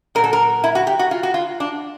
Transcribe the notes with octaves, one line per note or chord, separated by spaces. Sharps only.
A#2 F#3 A#4
A4
A#4
E4
F#4
G4
F#4
F4
F#4
F4
D4